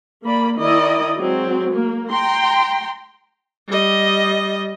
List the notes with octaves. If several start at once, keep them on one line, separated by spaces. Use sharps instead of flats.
A#3 D5 B5
D#3 E4 D5 D#5
F#3 G#3 C4
A#3
G5 A#5 C6
G3 D#5